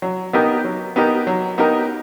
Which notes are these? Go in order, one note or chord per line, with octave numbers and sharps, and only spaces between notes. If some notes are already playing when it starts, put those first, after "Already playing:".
F#3
B3 D#4 G4 A#4
F#3
B3 D#4 G4 A#4
F#3
B3 D#4 G4 A#4